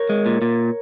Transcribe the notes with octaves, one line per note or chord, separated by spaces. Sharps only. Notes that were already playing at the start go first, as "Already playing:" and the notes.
Already playing: A#4 C#5
G#3
A#2
A#2